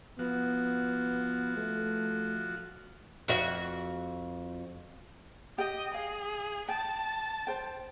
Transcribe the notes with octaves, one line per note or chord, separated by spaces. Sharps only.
F3 B3 F#4
A3
F2 F#4 E5
G4 D#5 G5
G#4 F5
G5 A5
C5 G5